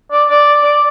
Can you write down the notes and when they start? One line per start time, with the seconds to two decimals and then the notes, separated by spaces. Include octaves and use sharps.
0.12 D5
0.29 D5
0.63 D5